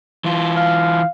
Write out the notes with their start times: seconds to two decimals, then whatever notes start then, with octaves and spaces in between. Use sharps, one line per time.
0.24 E3 F4
0.56 F5